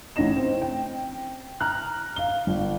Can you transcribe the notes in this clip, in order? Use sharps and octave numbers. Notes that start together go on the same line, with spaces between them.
A1 A2 C#4 D#4 A#6 E7
C4
G5
A#5 F6 F#6
F5 G7
G1